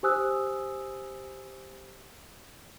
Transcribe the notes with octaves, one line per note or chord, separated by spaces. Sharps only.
G4 C5 G#5 D#6 E6 F#6